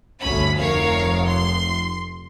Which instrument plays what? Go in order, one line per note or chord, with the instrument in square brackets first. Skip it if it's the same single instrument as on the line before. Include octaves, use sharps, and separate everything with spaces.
[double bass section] G1 D2 [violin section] C#4 B5
[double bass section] F1 [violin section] A#4 C#5 F5
[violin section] C6